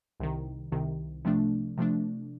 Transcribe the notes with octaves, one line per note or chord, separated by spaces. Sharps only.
C2 C3 D#3
C2 C3 D#3
C3 F3 A3 D4
C3 F3 A3 D4